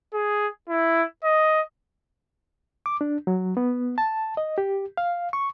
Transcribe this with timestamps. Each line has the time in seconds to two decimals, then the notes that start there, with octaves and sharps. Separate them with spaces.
0.14 G#4
0.69 E4
1.24 D#5
2.86 D6
3.01 D4
3.27 F#3
3.57 B3
3.98 A5
4.37 D#5
4.58 G4
4.97 F5
5.33 C#6